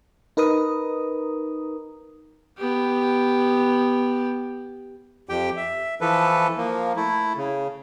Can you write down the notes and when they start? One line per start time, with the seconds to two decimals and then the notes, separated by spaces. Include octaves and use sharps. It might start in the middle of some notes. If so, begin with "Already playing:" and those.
0.37 D#4 A#4 B4 A#5 D#6
2.58 B3 G4
5.29 F2 G4 G5
5.57 E5
6.01 E3 F3 A4 B4
6.57 F3 A#3
6.96 A3 E4
7.37 C#3